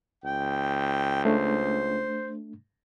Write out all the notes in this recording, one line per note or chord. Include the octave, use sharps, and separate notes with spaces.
C#2 G5
A3 D4 C5